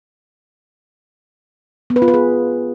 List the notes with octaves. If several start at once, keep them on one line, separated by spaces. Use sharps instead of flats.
B3
B4
F4
B4
G#4